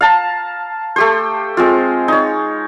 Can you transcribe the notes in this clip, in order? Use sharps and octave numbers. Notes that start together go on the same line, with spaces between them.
F5 A5 A#5
A3 G4 C5
G#3 C4 F4
D#4 C#5